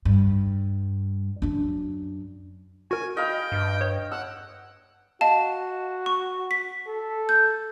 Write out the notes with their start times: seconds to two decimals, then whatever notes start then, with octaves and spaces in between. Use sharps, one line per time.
0.05 G2
1.42 F#2 D4
2.91 F#4 A#4 G#5
3.17 D#5 F5 G5 B5
3.52 G2
3.81 C#5
4.12 F#5 E6
5.21 F#4 D#5 F5 A5
6.06 C#6
6.51 B6
6.87 A4
7.29 G6